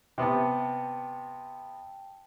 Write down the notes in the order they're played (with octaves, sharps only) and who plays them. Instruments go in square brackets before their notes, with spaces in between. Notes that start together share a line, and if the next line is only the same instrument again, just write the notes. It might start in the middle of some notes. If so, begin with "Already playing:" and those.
[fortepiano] C3 B3 [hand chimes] G5 A5